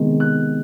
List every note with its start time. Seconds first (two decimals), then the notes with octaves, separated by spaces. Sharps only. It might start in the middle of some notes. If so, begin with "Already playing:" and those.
Already playing: C3 D#3 G#3 B3
0.20 F#6